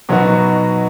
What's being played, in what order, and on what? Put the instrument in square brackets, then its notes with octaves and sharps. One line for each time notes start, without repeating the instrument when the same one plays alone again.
[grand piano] B2 F#3 B3 D#4 F#4